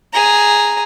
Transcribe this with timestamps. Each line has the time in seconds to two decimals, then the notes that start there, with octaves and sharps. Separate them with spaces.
0.13 G#4 A#5